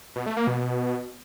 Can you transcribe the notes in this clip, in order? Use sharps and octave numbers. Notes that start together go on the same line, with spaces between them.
B2
A3
A#3
B2